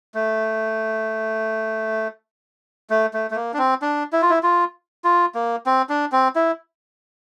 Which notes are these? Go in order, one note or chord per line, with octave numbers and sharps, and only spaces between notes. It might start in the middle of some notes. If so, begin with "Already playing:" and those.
A3
A3
A3
A3
A#3
D4
C4
D4
E4
F4
E4
F4
F4
A#3
C4
D4
C4
E4